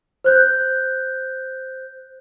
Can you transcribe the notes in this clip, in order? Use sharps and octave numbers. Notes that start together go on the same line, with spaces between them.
C5 F#6 G6